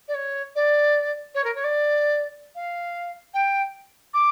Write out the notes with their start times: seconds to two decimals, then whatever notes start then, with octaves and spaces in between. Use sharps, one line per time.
0.08 D5
0.14 C#5
0.55 D5
1.35 C#5
1.44 A#4
1.55 C#5
1.64 D5
2.55 F5
3.34 G5
4.14 D6